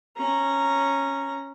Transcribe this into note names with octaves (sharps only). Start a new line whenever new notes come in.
C#4 A#5